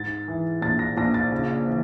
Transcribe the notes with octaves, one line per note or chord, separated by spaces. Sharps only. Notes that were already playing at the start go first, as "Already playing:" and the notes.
Already playing: G#2 A6
E3
A#1 A6
A#6
A#1 A#6
A6
C#3
E3